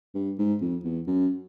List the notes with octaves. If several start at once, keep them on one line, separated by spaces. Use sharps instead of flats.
G2
G#2
F2
E2
F#2